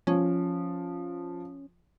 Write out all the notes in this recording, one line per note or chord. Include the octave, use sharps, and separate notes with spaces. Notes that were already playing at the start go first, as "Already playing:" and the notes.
F3 C#4